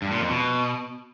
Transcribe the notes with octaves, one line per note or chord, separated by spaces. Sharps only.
G2
A#2
F2
B2